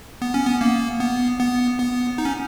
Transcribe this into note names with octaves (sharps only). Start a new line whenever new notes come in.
B3
C#4
B3
A#3
B3
B3
B3
D#4
C#4